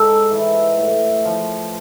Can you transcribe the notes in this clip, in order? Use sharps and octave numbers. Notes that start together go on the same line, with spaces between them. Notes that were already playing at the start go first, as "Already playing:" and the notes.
Already playing: G#2 A4
E3
A2
F3